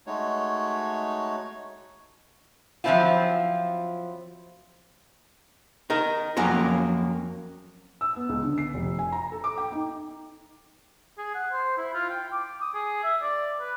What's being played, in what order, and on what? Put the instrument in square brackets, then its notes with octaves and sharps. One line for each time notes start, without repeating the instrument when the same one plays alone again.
[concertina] G#3 A3 D#4 F#4 C#5
[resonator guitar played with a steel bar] F3 F#3 G#3 C4 E4 F4
[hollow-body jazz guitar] D#4 A#4
F2 F#3 A#3 C#4 A#4
[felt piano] E6
B3
C#2
D3
C7
F1
G#5
A#5
A4
D6
G5
D#4
[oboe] G#4
F#5
C5
E4
F4
G5
D6
D#6
G#4
E5
D5
B4